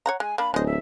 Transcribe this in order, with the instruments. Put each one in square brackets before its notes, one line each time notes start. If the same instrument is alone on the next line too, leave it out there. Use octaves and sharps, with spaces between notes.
[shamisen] C#5 F#5 A#5
[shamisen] G#3 [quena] G#5
[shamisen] A#3 D4 [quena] B5
[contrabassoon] D1 [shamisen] G#3 D#5 [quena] C5
[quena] E5